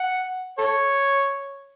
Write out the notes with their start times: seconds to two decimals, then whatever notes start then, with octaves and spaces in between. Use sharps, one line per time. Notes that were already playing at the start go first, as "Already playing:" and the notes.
Already playing: F#5
0.58 A4 C#5